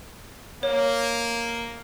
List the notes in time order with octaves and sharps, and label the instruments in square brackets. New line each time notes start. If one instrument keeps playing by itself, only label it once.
[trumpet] A#3 [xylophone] C#5